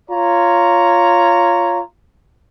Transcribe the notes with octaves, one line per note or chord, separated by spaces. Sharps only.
F4 C#5 A#5